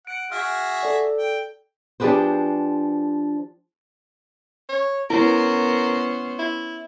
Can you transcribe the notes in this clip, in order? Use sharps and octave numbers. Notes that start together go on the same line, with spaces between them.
F#5 D7
F#4 G#4 E5 F6 F#6
A4 D5
G5
F3 D4 G4 G#4 B4 C5
C#5
B3 C#4 E4 A#4 C5
E4